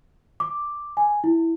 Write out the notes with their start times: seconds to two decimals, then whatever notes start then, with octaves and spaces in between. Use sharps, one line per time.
0.40 D6
0.97 G#5
1.24 E4